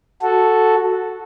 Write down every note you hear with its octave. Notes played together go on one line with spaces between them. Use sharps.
F#4 A4